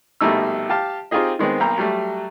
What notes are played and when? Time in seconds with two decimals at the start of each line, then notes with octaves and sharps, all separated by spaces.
0.21 A#1 B2 G3 A3 D#4 E6
0.69 G4 F5 A5
1.11 C4 D#4 F4 G4 G#4 D#5
1.39 D#3 G#3 B3 C4
1.60 B1 A#3 G5 A#5
1.78 F#3 G3 A3